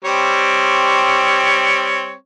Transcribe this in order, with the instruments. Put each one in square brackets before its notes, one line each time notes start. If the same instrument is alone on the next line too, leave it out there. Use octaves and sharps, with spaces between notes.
[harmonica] G3 C4 C#5